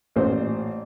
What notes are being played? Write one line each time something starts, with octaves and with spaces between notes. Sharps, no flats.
A1 A#2 C5